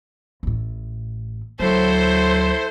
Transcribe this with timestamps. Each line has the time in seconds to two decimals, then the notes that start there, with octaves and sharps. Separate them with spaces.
0.43 A1 A2
1.60 D2 F#3 E4 A4 C5